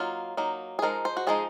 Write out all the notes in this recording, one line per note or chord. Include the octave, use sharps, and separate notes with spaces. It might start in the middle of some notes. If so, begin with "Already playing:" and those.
Already playing: F#3 A#3 D#4 F4
F#3 A#3 D#4
G#4
F3 G#3 D#4 A#4
C5
F#4
F3 G#3 D#4 G#4